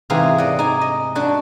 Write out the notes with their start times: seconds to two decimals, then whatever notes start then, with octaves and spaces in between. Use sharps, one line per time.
0.10 G#2 C3 E3 G4 G#4 F5
0.38 D5 D#5 F#5
0.59 D#4 G#5
0.81 D#5
1.15 D4 F#4 D5 F#5 A5